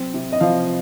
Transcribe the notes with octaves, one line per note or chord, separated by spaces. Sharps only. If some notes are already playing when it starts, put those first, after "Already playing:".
Already playing: F#3 C4
C3
D#5
F3 F5